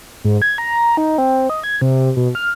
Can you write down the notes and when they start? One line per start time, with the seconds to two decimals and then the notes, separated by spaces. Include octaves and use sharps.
0.24 G#2
0.42 G#6
0.58 A#5
0.97 D#4
1.18 C4
1.50 D#5
1.63 G#6
1.81 C3
2.17 B2
2.35 F6